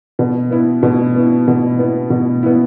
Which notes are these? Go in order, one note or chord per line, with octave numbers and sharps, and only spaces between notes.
B2
B3 E4
B2
B3 E4
B2
B3 E4
B2
B3 E4